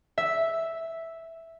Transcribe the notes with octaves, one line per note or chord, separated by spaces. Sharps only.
E5